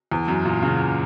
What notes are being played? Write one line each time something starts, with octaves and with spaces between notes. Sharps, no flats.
E2
F#2
A#2
C#3